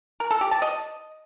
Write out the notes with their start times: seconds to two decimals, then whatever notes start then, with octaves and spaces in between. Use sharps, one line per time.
0.20 A#4
0.31 A4
0.41 G4
0.51 A5
0.62 D#5